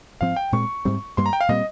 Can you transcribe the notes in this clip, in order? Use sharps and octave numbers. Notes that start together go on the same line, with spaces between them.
G#2 F3 C4 F5
G5
A#2 G#3 C4 C#6
G#2 G3 C4
G2 G3 A#3 C6
A#5
G5
F5
A#2 G3 C4 D#5